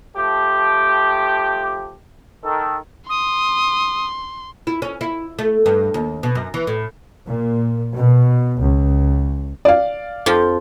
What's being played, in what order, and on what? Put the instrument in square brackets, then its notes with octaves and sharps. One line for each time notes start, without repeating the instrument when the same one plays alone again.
[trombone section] F3 A3 G4
D#3 A4
[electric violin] C6 [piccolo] D#6
[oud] E4
C#4
E4
A3
G2
D#2
B2
F#2
E3
A2
[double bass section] A#2
B2
C#2
[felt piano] D5 F5
[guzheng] F2 F3 F4